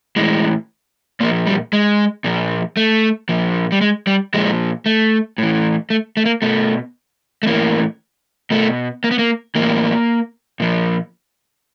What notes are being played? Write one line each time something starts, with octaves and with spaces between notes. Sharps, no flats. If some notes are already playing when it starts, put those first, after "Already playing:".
A2 E3 G#3
A#2 F3 A#3
G3
G#3
A#2 F3
A3
A#2 F3
G3
G#3
G3
A#2 F3 G#3
A3
A2 E3
A3
A3
A#3
B2 A3
A3
A2 E3 A#3
B2 A3
A#3
B3
A#3
A2 E3 A#3
A#2 F3